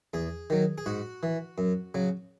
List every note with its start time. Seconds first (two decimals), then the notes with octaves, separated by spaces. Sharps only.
0.14 E2 G#4
0.50 D#3 F#3
0.78 G#4
0.86 G#2 F#4
1.23 E3
1.58 F#2
1.95 C#3 F#3